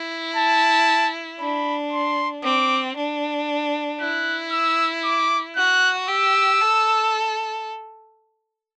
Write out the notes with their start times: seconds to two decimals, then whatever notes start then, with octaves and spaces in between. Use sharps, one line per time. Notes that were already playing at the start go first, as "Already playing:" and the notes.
Already playing: E4
0.36 A5
1.40 D4 B5
1.93 C6
2.43 C4 D6
2.97 D4
4.00 E4 F#6
4.52 E6
5.05 D6
5.57 F#4 F#6
6.08 G4 E6
6.61 A4